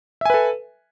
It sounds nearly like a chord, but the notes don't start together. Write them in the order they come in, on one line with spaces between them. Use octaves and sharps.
E5 G#5 B4 A4